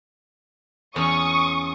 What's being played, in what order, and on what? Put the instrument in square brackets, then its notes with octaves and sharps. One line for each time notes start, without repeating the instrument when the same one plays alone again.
[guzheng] E2 C#4 [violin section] C#6 D#6